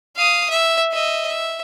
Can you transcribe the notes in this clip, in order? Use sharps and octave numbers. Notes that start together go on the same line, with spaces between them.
F5 D#6
E5
D#5 E5
E5